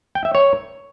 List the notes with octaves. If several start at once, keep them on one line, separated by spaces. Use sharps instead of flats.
G5
E5
C#5